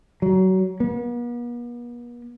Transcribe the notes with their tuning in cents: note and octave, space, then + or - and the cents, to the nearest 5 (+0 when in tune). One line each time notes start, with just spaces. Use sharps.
F#3 +25
B3 -45